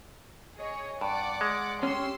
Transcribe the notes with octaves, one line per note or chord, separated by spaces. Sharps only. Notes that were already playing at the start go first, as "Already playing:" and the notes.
G#4 C#5 D#5
G2 D5 F#5 D6
G#3
C#4 G4 C6 E6